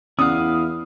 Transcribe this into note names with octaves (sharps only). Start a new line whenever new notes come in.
E2 C#4 E4 D5 F5 F#5 D#6